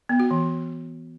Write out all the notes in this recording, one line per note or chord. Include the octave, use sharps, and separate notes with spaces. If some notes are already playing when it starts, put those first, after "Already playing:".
B3
F#4
E3